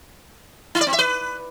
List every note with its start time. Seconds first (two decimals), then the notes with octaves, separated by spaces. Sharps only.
0.75 E4
0.81 D5
0.87 C4
0.93 E5
0.99 B4